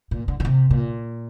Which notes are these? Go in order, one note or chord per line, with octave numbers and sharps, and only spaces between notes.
A#2
D3
D3
C3
A#2